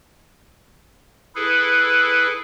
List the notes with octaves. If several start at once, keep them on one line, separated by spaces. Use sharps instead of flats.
E4 G#4 A4 B4